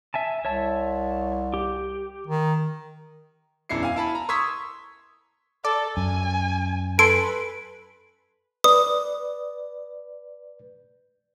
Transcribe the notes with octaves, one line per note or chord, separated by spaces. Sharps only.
E5 G#5 A5
C2 C#5 E5 A5
G4
D#3
E1 F#2 D4 E4 C7 C#7
F5 G#5
E4 A5 B5
A#5
C6 C#6 D#6 E6 G#6 B6
A4 D5
F#2 G#5
A4 B4 G#5 C6 D7
B4 D5 D#6